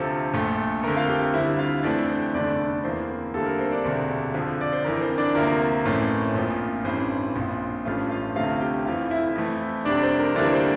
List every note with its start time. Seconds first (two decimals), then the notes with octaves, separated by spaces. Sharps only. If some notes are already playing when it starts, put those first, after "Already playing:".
Already playing: D2 C3 F3 C4 A4
0.33 A#1 A#2 A3
0.83 F2 D3 A3 A#4
0.96 F4 F5
1.08 G4 G5
1.34 D2 D3 G3 C4 E4 E5
1.59 F4 F5
1.83 F2 E3 A3 C4 D4 D5
2.08 C4 C5
2.34 F1 E2 D3 A3 D4 D5
2.84 E2 E3 A#3 C4 C5
3.34 D2 D3 G3 A#3 A4
3.46 A#4
3.59 C4 C5
3.71 D4 D5
3.85 E1 D2 C3
4.34 F2 D3 F3
4.61 D5
4.73 C5
4.85 G1 F2 E3 A#4
5.01 C4 C5
5.18 D4 D5
5.35 D2 C3 F3 A#3 A#4
5.85 A1 A2 E3 A3 C4
6.34 A#1 A#2 F3 C4
6.85 A1 G2 E3 C4 C5
7.36 A#1 A#2 F3
7.85 A1 G2 F3 A3 F4 F5
8.10 F4 F5
8.35 D2 C3 F3 A3 C4 F4 F5
8.61 G4 G5
8.85 F1 F2 E3 F4 F5
9.11 E4 E5
9.35 F2 E3 A3
9.85 F1 F2 C3 G3 D4 D5
10.03 C4 C5
10.19 A#4
10.35 D2 C3 E3 G3 A#3 D4 D5
10.53 C4 C5